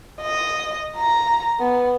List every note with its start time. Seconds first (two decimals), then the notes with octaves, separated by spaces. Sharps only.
0.21 D#5
0.97 A#5
1.60 B3